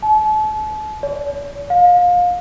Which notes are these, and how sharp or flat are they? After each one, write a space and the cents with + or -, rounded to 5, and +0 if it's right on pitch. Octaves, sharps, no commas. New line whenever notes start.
A5 -40
D5 -45
F5 +30